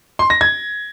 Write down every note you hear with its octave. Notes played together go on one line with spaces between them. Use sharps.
C6
A#6
G#6